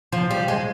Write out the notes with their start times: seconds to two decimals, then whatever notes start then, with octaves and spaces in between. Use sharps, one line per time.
0.12 F3
0.31 G3
0.48 G#3